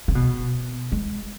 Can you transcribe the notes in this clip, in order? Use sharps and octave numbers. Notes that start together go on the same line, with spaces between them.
C#3
B2
G#3